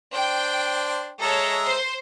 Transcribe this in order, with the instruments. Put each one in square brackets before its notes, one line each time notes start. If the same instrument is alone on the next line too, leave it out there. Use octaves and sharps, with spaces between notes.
[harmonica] D4 C5 [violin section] G5
[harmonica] G#3 E5 A#5 [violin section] A4 C#5
[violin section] C5 C6